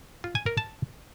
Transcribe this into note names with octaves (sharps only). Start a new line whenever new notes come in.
F4
G#5
A#4
A5